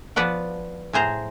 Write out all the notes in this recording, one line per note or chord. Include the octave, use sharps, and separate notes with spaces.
F3 B3 B4 D5 F#5
A2 G#4 C5 A#5